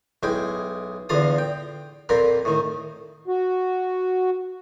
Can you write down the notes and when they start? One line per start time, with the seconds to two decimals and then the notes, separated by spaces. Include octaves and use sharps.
0.23 B1 G#3 E4 G5
1.09 E2 D3 F3 F4 F5 D#6
1.38 G5
2.09 F2 A#2 C4 F4 A#4 B5
2.45 A2 D#3
3.27 F#4